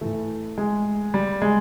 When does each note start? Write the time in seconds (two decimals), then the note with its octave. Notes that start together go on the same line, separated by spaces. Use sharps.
0.01 A2 E3 A3
0.58 G#3
1.14 G3
1.42 G#3